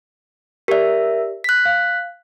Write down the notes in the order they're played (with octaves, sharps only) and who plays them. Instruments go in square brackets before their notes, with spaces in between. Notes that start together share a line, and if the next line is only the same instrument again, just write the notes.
[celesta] G4 D5 [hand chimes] A#4 E5
[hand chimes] F#6 B6
[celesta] F5